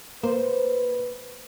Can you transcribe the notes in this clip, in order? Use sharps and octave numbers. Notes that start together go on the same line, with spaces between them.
A#3 B4 C5